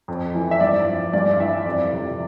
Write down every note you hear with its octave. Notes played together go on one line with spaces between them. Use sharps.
F2
E3
E5
G2 D5
F3
G2 D5
E3 E5
F2 D5
C3 F3